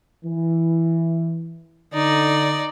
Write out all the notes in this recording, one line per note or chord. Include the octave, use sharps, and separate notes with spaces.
E3
D3 D#4 D5